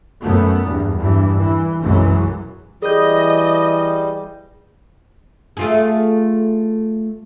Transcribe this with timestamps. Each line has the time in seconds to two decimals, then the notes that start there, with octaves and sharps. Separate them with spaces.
0.23 F#2 A3 B3
0.66 E2 G2
0.96 G2 E3
1.39 E3
1.81 B1 F#2 E3 G#3
2.82 E3 G3 G#4 D#5 G6
5.57 A3 F4 G#4